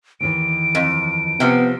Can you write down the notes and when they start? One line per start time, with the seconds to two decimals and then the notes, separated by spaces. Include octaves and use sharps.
0.21 D#2 D#3 E3 D7
0.75 F2
1.40 C3 F3 B3